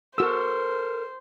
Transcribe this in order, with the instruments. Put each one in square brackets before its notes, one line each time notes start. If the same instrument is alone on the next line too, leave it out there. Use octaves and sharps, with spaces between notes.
[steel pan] F#4 E6 [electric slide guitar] A4 A#4 [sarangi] C5